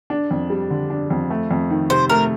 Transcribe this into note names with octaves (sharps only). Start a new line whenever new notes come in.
D4
F2
G3
D3
D4
F2
A3
F2
D#3
C3 C5
A3 A#4